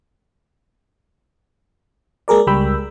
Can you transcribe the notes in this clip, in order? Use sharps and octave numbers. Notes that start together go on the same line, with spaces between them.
G#3 A#3 G#4 A#4 D5
C#2 G3 G5 B5 E6